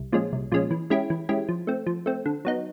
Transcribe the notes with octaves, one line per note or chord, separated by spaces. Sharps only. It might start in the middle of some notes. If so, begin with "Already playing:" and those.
Already playing: C2
A#2 F3 G#3 C#4
C2
A#2 F3 G#3 C#4
E3
G#3 C#4 E4 G4
E3
G#3 C#4 E4 G4
F3
A3 C4
F3
A3 C4
D3
F#3 B3 D#4